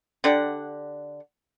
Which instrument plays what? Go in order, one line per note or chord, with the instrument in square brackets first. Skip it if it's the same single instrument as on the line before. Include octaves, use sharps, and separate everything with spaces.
[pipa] D3 D4 G4 F#5